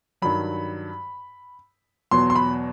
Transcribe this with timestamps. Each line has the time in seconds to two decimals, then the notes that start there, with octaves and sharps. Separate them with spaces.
0.22 G2 D#3 F#3 B5
2.11 E2 B2 F#3 C6
2.30 C6
2.36 B5